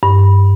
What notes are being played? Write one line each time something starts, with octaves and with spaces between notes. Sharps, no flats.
G2